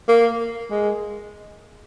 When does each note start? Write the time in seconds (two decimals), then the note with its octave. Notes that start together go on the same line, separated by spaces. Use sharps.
0.08 A#3
0.71 G#3